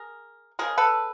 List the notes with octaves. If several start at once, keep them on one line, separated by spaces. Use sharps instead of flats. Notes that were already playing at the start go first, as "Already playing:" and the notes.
Already playing: G#4 A#4
C#3 F3 G#3 G#4 A#4
A4 B4